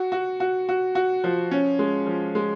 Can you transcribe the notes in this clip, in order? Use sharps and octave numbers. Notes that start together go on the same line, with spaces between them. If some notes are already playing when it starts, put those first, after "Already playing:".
Already playing: F#4
F#4
F#4
F#4
F#4
F3
C#4
G#3
F3
G#3